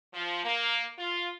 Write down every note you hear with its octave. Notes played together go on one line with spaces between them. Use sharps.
F3
A#3
F4